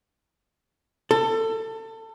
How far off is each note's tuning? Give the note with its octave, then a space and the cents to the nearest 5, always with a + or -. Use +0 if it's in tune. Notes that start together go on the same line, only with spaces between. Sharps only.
A4 +25